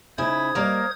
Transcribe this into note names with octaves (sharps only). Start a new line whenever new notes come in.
C#3 D#4 E4 C5 D#6 G#6
G3 A#3 A#4 D5 D#5